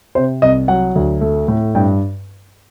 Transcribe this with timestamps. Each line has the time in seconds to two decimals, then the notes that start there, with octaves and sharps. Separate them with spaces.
0.15 C3 C5
0.42 C2 D#5
0.68 F#3 F#5
0.95 D2
1.21 A3
1.48 A2
1.75 G2 G5